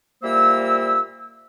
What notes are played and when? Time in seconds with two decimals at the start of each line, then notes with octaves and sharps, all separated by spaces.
0.23 A#2 G3 A#3 C5 E5 E6